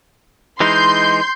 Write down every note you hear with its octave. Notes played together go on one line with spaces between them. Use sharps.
E3 G#3 D#4 C6 G6